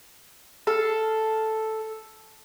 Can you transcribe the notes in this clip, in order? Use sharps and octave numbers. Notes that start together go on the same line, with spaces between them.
A4 F5